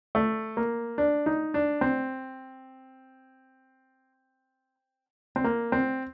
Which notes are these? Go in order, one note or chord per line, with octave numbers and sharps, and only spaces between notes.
A3
A#3
D4
D#4
D4
C4
C4
A#3
C4